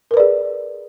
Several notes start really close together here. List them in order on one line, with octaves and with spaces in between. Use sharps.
A#4 B4 D5 G#4